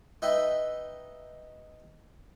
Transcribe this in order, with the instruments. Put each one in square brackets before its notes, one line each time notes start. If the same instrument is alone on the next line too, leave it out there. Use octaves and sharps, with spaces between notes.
[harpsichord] D#4 B4 E5 G5